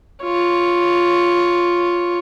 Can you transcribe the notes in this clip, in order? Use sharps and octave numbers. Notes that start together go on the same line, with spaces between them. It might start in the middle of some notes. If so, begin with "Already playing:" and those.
F4 C#5